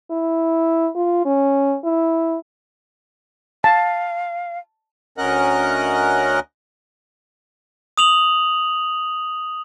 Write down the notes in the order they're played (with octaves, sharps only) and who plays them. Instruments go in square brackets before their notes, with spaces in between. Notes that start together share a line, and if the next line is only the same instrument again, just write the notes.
[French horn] E4
F4
C#4
E4
[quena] F5 [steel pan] A5
[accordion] D2 C#4 A#4 D#5 F#5 F#6
[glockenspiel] D#6 F7 F#7